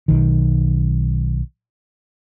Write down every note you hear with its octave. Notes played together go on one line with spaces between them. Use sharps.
B1 D#3